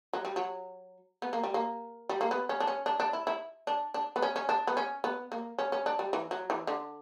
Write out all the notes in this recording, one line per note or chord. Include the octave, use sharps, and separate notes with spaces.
F#3
G3
F#3
B3
A#3
G3
A#3
G3
A#3
B3
C#4
D4
C#4
D4
D4
E4
E4
D4
D4
B3
C#4
C#4
D4
B3
C#4
B3
A#3
C#4
C#4
D4
G3
E3
F#3
E3
D3